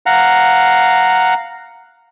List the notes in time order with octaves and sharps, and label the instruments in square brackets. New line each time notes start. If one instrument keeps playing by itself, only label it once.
[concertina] F5 F#5 A#5